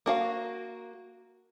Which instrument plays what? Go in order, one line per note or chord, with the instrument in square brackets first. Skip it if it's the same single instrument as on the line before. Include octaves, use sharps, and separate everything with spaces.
[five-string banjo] A#3 F#4 F5